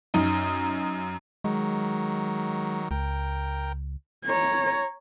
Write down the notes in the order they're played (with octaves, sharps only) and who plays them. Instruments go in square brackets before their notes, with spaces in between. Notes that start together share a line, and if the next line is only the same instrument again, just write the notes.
[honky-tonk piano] F#2 D#4
[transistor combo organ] D#3 F#3 [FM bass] G#3
[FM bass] C#2 [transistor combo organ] A#4 G5
[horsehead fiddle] C#5 A#5